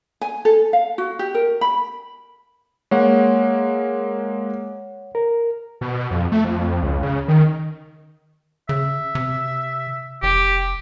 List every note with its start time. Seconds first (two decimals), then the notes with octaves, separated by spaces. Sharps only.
0.21 G#5
0.45 A4
0.73 F5
0.98 F#4
1.19 G4
1.34 A#4
1.61 B5
2.91 G#3 A#3 C#5 F#5
5.15 A#4
5.81 B2
6.11 F2
6.32 A3
6.45 F2
6.83 C#2
7.03 C#3
7.28 D#3
8.69 C#3 E5
9.15 C3
10.23 F1 G4